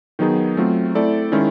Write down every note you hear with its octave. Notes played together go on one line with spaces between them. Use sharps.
D#3 F#3 B3 D#4 G#4
F#3 A3 C4 F4
A3 C4 E4 A4 D5
D#3 G#3 C#4 E4